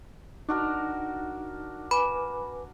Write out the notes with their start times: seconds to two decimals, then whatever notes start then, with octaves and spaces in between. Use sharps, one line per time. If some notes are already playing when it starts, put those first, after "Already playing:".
0.49 D4 D#4 F#4 A#4
1.91 B4 G#5 B5 D6